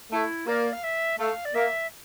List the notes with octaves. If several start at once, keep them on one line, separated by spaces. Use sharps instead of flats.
A3 E4
A#3 D5
F5
E5
A3 F5
D5
A#3 E5